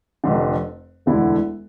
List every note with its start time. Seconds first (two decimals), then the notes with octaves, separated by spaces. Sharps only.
0.24 F1 F2 D3
1.06 E1 D2 D3 A3 E4